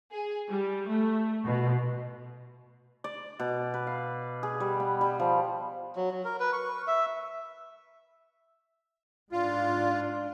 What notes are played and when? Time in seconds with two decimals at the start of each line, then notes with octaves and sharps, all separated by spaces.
0.12 G#4
0.48 G3
0.88 A3
1.45 B2
3.04 D5
3.39 B2
3.74 B4
3.87 F5
4.43 G#4
4.60 G3
4.80 B3
5.01 G3
5.19 F3
5.96 F#3
6.11 F#3
6.25 A#4
6.40 B4
6.53 C#6
6.87 E5
9.32 G#2 D4 F4